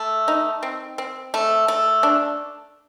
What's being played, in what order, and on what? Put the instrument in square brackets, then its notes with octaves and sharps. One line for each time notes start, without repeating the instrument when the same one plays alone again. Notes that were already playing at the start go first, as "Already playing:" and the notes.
Already playing: [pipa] A3
D#4
C4
C4
A3
A3
D4